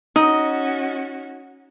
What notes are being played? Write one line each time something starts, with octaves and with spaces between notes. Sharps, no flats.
C#4 D#4 F#4 D#5